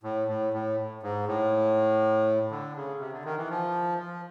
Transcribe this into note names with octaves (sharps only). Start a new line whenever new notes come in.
A2
A2
A2
G#2
A2
D3
C#3
C3
D3
D#3
E3
F3
F3